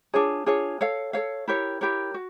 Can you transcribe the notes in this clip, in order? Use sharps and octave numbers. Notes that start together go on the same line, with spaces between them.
D4 F4 G#4 C#5
D4 F4 G#4 C#5
A4 C#5 F5
A4 C#5 F5
E4 G4 A#4 C#5
E4 G4 A#4 C#5
F#4